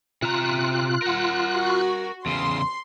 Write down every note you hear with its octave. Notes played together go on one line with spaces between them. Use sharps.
C3 F4 A#5 F#6
A#4 F#5
F#4
E2 C#3 C6